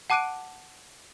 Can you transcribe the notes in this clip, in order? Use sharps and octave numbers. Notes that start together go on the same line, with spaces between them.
F#5 A5 D6 F#6 D7 D#7